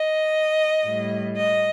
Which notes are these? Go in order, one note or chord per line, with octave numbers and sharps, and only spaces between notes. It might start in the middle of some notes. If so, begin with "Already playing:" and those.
Already playing: D#5
A2 G3
D#5